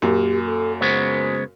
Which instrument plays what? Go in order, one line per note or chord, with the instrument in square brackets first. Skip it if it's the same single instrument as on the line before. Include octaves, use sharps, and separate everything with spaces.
[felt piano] F#2 A#2 [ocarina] G4
[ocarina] A4
[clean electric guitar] C#3 G#3 B3 [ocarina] C5